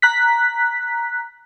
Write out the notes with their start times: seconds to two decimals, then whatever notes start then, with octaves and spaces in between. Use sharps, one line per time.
0.02 A#5 F#6 B6